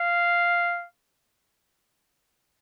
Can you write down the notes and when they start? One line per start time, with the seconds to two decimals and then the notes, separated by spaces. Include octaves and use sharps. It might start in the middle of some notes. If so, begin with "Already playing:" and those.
Already playing: F5